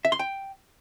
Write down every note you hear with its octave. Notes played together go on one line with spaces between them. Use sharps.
E5
C6
G5